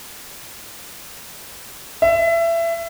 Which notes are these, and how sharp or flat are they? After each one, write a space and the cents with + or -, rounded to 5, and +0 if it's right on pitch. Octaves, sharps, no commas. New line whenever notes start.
E5 +25